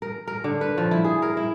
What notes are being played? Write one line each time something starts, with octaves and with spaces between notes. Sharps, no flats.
A#4
A#4
D3
B4
F3
E4
G#4
A#4
E4